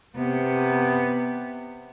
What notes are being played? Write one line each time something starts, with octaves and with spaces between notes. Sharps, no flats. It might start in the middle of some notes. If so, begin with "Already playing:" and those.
C3 B3